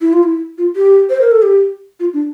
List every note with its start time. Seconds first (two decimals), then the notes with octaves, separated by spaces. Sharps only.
0.01 E4
0.13 F4
0.23 E4
0.58 F4
0.76 G4
1.10 C5
1.21 A#4
1.32 A4
1.42 G4
2.00 F4
2.14 D4